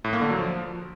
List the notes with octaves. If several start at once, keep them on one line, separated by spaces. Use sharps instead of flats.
A2
A#3
D3
F#3
F3